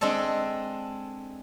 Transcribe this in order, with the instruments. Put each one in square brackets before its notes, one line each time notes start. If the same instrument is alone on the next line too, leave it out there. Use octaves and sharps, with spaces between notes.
[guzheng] G#3 C4 D4 A4